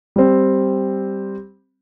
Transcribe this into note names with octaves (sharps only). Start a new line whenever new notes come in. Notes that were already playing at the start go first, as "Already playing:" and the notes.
G3 C4